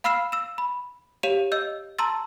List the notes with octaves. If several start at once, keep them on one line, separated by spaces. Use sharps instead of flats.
F5 B5 E6 F6 C7 E7
E6 E7
B5
G4 C#5 F5 E7 F7
D#5 E6 G6
A5 A#5 C6 E6 A6